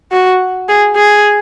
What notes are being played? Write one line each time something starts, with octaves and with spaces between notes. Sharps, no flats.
F#4
G#4
G#4